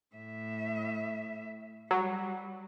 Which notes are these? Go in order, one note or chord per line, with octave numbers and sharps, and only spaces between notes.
A2 E5
F#3 G3